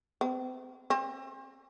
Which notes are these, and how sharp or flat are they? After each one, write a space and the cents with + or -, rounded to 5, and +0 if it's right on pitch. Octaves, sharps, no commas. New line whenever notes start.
C4 -40
C4 +35